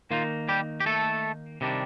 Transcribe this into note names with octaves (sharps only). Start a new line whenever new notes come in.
D#3 A#3 D#4 F4
G3 G4
G4
A3 A4
C3 D#3 G3 D4